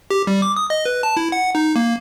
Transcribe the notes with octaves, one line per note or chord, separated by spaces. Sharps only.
G4
G3
D6
D#6
D#5
B4
A5
E4
F#5
D#4
A#3